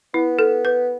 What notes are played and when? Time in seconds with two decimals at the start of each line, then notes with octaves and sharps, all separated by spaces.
0.14 B3 E4
0.39 A4
0.65 B4